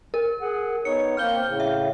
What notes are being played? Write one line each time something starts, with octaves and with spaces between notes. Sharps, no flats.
A#4
G#4 F#5
B3 D#4 C#5 C#7
A#3 C4 F6 G6 G7
A2 C#3
E5